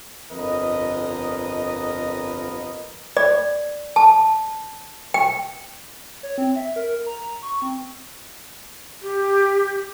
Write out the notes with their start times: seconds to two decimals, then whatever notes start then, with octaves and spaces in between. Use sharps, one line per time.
0.32 G1 F2 A#4 B4 D#5
3.17 D5
3.96 A5
5.14 G5
6.23 C#5
6.38 C4
6.56 E5
6.76 A#4
7.06 A#5
7.43 C#6
7.62 C4
9.02 G4